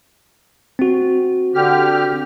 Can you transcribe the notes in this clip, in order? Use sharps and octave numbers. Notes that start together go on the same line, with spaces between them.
C4 F#4
D3 G4 F6